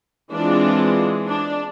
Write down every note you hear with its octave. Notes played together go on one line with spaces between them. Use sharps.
E3 G#3 C4 D4 F4
D4